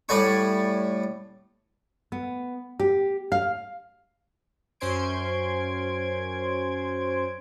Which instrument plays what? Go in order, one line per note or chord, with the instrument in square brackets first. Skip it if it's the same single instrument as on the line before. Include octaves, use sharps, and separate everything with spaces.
[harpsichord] A2 G3 D5 F#5 G#5 C#6
[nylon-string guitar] B3
G4
F5
[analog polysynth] F#2 C#4 C5 C6 G#6 D7